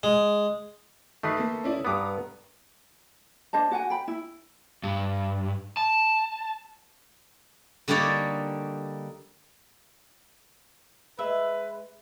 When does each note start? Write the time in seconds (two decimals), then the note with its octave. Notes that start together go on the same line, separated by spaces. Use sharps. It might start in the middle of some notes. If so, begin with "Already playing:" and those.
0.03 G#3
1.23 D#3 A3 B4 D#6 C7
1.37 A#3 A4
1.64 C#4 E4 D5
1.85 G2 B3 A#5 D6 D#6
3.53 D4 C5 D#5 A5
3.71 F#4 F#5 G#5
3.90 G5 B5
4.08 E4
4.83 G2
5.77 A5
7.88 D3 G3 A#3 D#4 C#5 D5
11.19 G#3 B4 E5